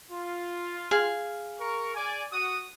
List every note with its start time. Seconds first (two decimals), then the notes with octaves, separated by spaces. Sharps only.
0.10 F4
0.91 G#4 F5
1.60 A#4 C#6
1.95 D5 G#5
2.31 F#4 D#6